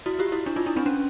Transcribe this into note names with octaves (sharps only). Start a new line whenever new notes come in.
E4 F#4
F4 G4
E4 F#4
D4 E4
D#4 F4
D4 E4
C4 D4
C#4